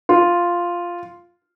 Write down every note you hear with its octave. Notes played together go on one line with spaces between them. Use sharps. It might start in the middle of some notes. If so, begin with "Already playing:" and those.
F4